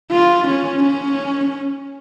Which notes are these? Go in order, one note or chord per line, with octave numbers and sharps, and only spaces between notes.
F4
C#4
C#4